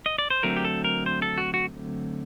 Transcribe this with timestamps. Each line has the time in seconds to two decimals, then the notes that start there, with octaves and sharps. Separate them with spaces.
0.06 D#5
0.18 D5
0.30 C5
0.43 D3 F#3 A3 C4 A#4
0.57 G4
0.64 A4
0.84 A#4
1.06 C5
1.22 A4
1.38 F#4
1.54 F#4